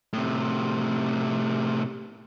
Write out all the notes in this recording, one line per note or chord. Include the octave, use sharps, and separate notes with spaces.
A2 C3